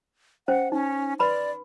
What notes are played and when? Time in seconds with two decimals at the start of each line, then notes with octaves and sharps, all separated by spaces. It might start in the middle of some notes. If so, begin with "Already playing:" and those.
0.48 C#4 C5 F#5
0.72 C#4 D#4
1.19 B4 D5 B5 C6